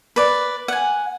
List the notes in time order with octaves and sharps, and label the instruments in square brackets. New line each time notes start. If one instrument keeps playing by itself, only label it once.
[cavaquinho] B4 D5
F#5 G#5